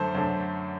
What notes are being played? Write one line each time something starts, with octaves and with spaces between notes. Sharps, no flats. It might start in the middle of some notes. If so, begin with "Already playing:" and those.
Already playing: F#2 D3 A3 A4 C5
F#2 D3 A3